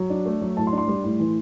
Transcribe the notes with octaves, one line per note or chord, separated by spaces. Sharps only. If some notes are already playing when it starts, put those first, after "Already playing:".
Already playing: F#3
D4
A3
F#3
A2 A5
C6
D4
C6
G3
A2
E3